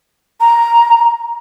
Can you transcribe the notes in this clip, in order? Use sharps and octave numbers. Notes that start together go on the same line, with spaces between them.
A#5